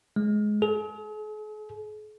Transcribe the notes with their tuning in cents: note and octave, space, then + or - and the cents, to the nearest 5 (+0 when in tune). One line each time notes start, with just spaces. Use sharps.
G#3 +15
G#4 +45